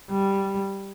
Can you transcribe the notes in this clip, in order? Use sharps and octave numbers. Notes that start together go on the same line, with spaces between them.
G3